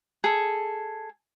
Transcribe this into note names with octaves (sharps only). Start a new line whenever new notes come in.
G#4 A4